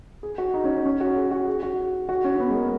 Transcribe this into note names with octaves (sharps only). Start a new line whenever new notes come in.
G#4
F#4
D#4
C#4
C#4
C#4
F#4
G#4
F#4
G#4
F#4
F#4
C#4
C#4
B3
G#3
A#3